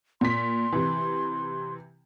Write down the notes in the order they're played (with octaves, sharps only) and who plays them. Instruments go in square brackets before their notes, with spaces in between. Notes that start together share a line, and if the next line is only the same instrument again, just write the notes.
[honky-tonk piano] A#2 B6 [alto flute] C6
[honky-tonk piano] C3 E3